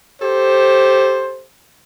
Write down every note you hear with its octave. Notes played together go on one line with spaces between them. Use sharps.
G4 A4 C5